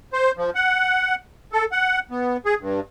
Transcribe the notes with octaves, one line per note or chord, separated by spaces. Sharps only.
C5
F3
F#5
A4
F#5
B3
G#4
G2